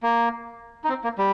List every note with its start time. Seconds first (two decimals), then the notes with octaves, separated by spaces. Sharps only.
0.03 A#3
0.84 D#4
0.89 C4
1.04 A#3
1.18 G3